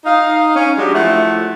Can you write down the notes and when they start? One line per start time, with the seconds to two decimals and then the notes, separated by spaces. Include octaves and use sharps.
0.05 D#4 F5
0.55 C#4
0.78 F#3 G#3 D4 G4
0.95 F3 A3 E4 F#5